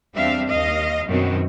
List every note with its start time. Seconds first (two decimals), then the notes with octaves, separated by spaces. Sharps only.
0.14 E2 G3 C4 D4 E5 F5
0.47 D#2 D#5 F5
1.07 F#2 B2 D#3 F#3 C4